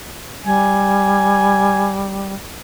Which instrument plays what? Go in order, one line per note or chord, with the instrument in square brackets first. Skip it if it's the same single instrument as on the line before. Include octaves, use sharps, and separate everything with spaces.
[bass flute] G3 [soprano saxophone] G#5